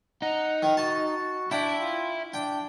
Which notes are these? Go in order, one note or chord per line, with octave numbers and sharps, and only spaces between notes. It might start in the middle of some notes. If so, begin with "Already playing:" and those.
D#4 F#5
D#3
F#4 A5
D4 E4 E5 G5
F4
D4 G5